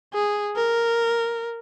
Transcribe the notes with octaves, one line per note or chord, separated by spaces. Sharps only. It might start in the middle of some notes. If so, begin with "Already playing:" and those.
G#4
A#4